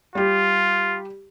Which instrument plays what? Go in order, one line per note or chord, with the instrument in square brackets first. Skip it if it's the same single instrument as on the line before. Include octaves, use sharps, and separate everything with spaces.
[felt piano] G3 G4 [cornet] F4